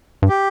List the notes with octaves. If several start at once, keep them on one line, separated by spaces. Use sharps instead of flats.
G2
G4